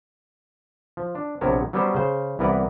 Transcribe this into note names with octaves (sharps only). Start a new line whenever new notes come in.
F3
D4
A#1 C3 B3 A#4 C#5 A5
F#3 G3 B3 C#4 G4 C5
C#3 C5
C2 E3 B3 A#4 B4 D5